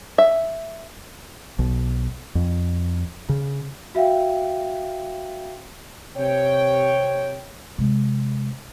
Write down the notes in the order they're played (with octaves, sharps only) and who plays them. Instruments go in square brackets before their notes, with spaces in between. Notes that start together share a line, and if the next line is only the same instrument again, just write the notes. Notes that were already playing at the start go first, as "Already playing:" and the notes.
[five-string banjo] E5
[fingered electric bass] B1
F2
C#3
[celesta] F#4 E5 F5 G5
[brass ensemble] C3 C#5 G5
[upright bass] C3 G#3